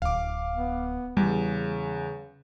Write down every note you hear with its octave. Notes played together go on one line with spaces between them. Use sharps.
D1 F5 D6
B3
E2 C#3 G3